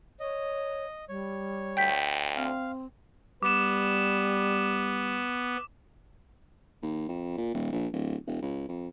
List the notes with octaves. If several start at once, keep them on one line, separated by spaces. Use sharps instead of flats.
C#5 D#5
G3 C#5
D2 G5 G6 B6
C4 F5
G3 B3 D6 E7
D#2
F2
A#2
D#1
A#1
D1
E1
C#2
F2